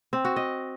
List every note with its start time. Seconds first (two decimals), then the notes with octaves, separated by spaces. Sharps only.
0.13 C4
0.25 F#4
0.36 D#5